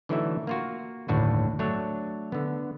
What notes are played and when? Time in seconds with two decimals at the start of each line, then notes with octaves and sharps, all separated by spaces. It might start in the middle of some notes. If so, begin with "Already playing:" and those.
0.09 D3 E3 F#3 A3 D#4 E5
0.47 A#3 F4 F#4
1.08 G1 D#2 A2 D4 F#4 B4
1.59 F#3 A3 D4 C#5
2.32 D3 B3